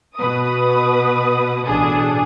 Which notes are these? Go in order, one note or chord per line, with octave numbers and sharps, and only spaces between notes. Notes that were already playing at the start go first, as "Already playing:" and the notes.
B2 B4 D#6
A1 B2 D4 G#4 A4 D#6